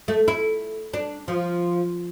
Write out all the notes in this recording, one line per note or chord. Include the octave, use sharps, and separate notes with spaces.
A3
E4
D4
F3